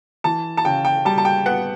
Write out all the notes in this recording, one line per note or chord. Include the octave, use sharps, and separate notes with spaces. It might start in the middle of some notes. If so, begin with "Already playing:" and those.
E3 A5
A5
C#3 G5
G5
G3 A5
A5
G5
B3 F#5